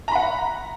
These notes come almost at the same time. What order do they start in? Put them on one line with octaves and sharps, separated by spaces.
A#5 B5 F#5